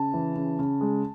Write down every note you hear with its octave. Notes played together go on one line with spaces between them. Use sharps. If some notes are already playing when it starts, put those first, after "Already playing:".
Already playing: C#3 A5
E3
C#3
C#3
G#3